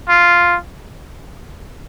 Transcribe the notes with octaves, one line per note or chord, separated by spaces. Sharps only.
F4